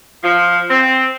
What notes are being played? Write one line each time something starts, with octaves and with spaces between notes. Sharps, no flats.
F3
C4